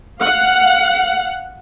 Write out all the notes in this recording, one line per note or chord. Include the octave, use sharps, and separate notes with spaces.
F5 F#5